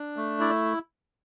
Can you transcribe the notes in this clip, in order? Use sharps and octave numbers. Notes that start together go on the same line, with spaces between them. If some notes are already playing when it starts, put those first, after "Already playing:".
Already playing: D4
A3
E4 D5